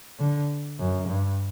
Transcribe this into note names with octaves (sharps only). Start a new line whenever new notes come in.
D3
F#2
G2